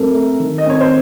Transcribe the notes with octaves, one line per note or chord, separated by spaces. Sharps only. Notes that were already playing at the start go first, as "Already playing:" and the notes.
Already playing: F#2 A3 C4 A4 A#4
A3
D#3
D#5
C4 C#5
C5